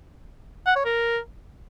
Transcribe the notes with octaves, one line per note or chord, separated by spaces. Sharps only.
F#5
C#5
A#4